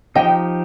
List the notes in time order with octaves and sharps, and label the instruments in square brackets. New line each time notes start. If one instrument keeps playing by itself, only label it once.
[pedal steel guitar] F3 D#4 G4 [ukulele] D#5 G5